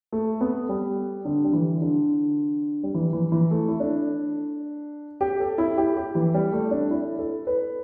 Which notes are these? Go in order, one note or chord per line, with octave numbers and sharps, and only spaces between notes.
A3
B3
G3
D3
G3
E3
D3
G3
E3
E3
E3
A3
E4
D4
G4
A4
E4
G4
G4
E3
G3
A3
D4
E4
A4
B4